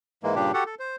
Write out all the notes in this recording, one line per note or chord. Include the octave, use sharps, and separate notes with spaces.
G#2 E3 G#3 A#3
G2 A#2 C#3 D4 G4
F#4 G4 A4 F#5
A4
C5